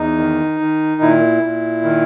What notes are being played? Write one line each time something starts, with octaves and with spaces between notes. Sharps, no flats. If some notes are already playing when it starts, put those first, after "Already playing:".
Already playing: E2 D#4
D#3
D#3
A#2 E4
A#2
D#3